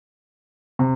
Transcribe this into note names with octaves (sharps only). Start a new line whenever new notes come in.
C3